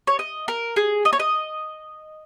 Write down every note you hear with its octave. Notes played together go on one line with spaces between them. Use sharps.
C#5
D#5
A#4
G#4
D#5
C#5
D#5